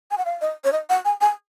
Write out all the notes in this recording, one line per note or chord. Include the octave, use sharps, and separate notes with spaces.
G#5
F#5
F5
D#5
C#5
D#5
F#5
G#5
G#5